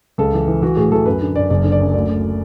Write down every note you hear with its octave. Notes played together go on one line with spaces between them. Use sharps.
C#2 A4
E3
E3
E3 F#4
A2 G#4
E3 A4
F#2 B4
D3
F#2 D5
F#1 D5
D3
D5
F#2
D2 D5
D2